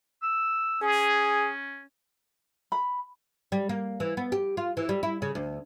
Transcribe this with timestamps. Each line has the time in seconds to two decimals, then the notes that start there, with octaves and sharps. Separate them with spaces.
0.22 E6
0.82 C#4 G#4
2.72 B5
3.52 G3
3.69 A#3
4.00 E3
4.17 B3
4.32 G4
4.57 F4
4.77 E3
4.89 G3
5.03 E4
5.22 C#3
5.35 D2